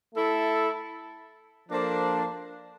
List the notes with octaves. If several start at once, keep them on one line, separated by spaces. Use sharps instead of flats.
A3 E4 A4
F3 A#3 D4 A4 C5